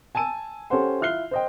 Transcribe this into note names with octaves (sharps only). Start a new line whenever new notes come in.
G#5 A5 E6 D#7
C#4 G4 A4 C5 F#5 C6
E4 F4 F6 F#6 C7 G7
C5 D#5 G5